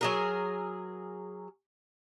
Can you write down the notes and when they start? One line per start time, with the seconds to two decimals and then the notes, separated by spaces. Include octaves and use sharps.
0.01 F#3 G#4 A#4